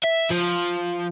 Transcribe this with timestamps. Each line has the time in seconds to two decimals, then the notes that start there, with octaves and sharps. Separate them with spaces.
0.03 E5
0.30 F3